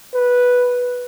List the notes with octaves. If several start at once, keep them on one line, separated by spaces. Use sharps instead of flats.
B4